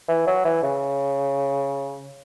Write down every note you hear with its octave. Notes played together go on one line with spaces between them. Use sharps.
E3
F#3
E3
C#3